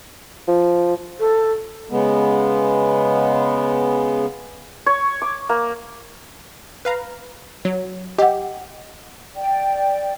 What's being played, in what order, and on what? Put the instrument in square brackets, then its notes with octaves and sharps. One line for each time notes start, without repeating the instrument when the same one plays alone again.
[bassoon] F3
[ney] A4
[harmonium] C#3 G#3 B3
[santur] C#5
D6
A#3
[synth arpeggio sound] B4 F5 A#5
F#3
[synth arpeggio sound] G4 [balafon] D#5 F#5
[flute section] D5 G5